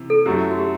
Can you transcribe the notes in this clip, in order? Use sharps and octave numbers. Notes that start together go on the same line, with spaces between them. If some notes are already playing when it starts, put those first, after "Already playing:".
Already playing: C3 E3
A4
F#2 F#3 A3 E4 G4
F#4
G4